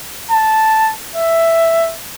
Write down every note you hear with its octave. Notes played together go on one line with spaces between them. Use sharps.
A5
E5